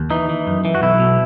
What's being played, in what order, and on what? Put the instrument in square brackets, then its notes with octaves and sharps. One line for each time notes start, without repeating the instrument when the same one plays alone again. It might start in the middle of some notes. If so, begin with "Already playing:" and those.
Already playing: [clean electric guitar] D#2
E3 D#4
E3
F#2
E3
F#4
B1 E4
B2